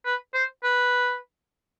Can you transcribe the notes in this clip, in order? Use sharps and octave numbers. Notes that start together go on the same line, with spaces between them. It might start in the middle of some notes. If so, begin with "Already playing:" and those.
B4
C5
B4